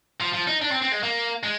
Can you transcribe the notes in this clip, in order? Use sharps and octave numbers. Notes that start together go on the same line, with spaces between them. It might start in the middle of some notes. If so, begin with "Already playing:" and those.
F3
F3
D#4
D4
C4
C4
G#3
A#3
G#3